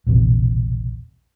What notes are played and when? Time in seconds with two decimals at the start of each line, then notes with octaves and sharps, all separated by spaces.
0.07 E1 A#1 C3